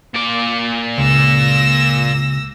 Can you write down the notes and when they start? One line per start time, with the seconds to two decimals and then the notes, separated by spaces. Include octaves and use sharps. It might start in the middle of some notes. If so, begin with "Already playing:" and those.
0.14 A#2 D5
0.98 C#2 E6 A#6